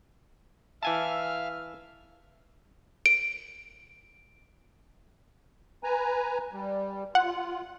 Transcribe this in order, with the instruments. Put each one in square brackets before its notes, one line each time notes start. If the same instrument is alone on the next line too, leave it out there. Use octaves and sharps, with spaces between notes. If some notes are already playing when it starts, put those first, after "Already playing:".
[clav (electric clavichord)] E3 G#5 A5 [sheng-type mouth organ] E5 F5 F6
[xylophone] D7
[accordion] B4 G#5 A#5
G3
[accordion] F4 [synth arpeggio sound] F#5